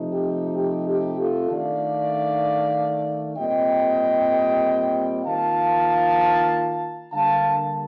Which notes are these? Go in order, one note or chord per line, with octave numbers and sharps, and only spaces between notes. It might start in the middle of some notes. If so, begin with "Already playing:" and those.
Already playing: C3 F3 A3 D#4
G4
G4
G4
F4 A4
D#3 A3 D4 D5 F5
A#2 G3 C4 D#5 G5
D#3 A#3 F4 F5 A5
D3 G3 A#3 F5 A5